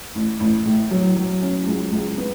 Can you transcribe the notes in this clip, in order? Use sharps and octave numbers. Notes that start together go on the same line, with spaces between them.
A1
A1
A2
F#3
F#3
C#4
C#2
C#2
B3